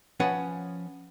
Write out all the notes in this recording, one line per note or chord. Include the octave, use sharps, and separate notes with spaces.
F3 C#4 B4 C#5 F#5 G#5